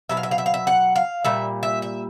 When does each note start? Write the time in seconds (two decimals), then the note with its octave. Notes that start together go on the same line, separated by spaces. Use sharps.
0.09 B2 F#3 E5
0.17 F5
0.23 E5
0.31 F5
0.38 E5
0.46 F5
0.54 E5
0.67 F#5
0.96 F5
1.24 A#2 G3 E5
1.63 E5
1.82 E5